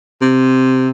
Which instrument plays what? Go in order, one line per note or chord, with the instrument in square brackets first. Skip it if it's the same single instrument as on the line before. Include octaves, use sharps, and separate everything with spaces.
[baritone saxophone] C3